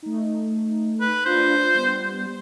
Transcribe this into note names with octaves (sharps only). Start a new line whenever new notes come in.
A3 D#4
B4
D4 F4 C5
G3 B3